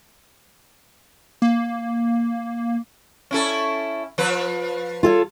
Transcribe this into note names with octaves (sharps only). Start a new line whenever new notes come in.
A#3
C#4 E4 A4
F3 B4
F4 A4 C#5